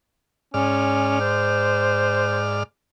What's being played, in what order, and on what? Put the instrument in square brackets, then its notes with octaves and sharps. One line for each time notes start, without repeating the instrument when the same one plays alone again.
[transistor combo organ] G#2 D5 F6 [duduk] C#4
[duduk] C5